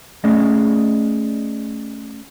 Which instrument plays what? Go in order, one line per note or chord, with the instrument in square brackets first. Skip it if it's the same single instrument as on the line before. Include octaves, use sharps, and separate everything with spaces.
[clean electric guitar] A3 C#4 G#4 D5 D#5